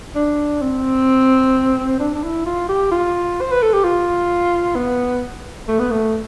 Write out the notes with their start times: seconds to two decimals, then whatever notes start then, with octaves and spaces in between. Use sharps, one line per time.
0.15 D4
0.62 C4
2.00 D4
2.14 D4
2.23 E4
2.46 F4
2.69 G4
2.92 F4
3.41 C5
3.52 B4
3.62 A4
3.74 G4
3.84 F4
4.76 B3
5.68 A3
5.79 B3
5.91 A3